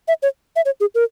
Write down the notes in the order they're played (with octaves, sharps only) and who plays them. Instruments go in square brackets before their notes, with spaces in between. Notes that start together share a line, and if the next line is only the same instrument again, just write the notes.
[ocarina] E5
C#5
E5
C#5
G#4
A#4